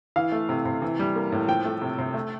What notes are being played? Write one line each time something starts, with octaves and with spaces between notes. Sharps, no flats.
E3 F5
A3
C3
C3
E3
G3
A#3
A2
F3 G5
A3
C3
C3
A3